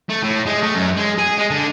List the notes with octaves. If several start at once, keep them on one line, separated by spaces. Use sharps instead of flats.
A3
A2
G#3
A3
F#2
G#3
G#4
G#3
D3